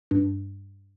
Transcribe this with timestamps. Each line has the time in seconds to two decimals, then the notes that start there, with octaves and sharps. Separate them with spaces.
0.11 G2